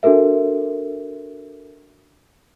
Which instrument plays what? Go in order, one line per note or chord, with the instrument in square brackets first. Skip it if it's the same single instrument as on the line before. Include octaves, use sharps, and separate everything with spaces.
[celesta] D4 F#4 A4 A#4 E5